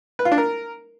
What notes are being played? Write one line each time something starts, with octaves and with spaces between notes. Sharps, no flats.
B4
F4
D4
A#4